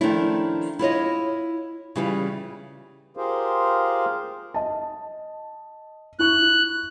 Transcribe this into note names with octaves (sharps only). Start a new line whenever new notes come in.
D#3 F3 A3 C#4 D4 E4
E4 F4 C#5 D#5
C#3 E3 G3 E4 F4
F4 G4 G#4 A#4 C5 F5
D#5 A5
E4 C#6 F#6